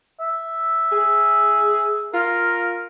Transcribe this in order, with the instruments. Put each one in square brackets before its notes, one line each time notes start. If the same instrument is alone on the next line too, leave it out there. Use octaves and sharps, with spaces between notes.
[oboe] E5
[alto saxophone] G#4
[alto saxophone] F4 [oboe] A#4